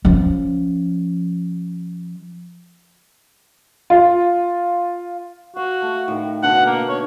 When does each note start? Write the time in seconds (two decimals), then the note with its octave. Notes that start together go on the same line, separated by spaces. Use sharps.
0.05 F3 C#4
3.90 F4
5.56 F#4 F5
5.82 A3
6.08 A2 D#3
6.43 B2 D3 D4 F#5
6.66 A#3
6.89 C#5